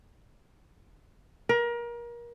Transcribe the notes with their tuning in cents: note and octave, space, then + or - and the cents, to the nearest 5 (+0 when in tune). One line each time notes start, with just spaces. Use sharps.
A#4 +30